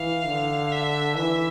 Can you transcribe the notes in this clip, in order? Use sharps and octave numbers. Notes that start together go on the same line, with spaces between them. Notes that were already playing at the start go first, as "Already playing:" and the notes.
Already playing: E3 F5
D3
E5
E3 E5